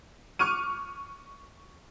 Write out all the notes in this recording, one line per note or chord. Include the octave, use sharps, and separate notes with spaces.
C#6 D6 F6 D#7